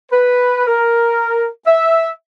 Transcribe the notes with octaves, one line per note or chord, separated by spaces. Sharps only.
B4
A#4
E5